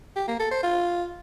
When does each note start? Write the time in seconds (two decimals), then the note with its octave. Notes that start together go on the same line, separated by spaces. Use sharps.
0.16 G4
0.28 A#3
0.39 A4
0.51 C5
0.63 F4